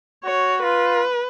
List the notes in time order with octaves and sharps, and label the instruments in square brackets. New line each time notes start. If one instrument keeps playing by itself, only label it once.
[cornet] F#4 [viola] C#5
[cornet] F4 [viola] B4